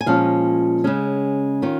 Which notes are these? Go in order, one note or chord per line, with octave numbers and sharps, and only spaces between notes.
G#5
A#2 F3 G#3 C#4 F5
C#3 G#3 C#4
D#3 C#4 F4